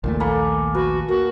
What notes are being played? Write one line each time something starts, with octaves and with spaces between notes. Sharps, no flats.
A#1 D#2 A#2 A3
A#3 A4 G#5 B5
F#4 B4
A#3 F#4